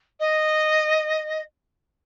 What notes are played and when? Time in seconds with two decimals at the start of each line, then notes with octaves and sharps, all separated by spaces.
0.20 D#5